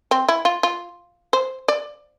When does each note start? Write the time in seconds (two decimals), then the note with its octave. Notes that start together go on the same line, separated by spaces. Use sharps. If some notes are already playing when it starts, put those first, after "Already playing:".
0.11 C4
0.29 E4
0.45 F4
0.63 F4
1.33 C5
1.68 D5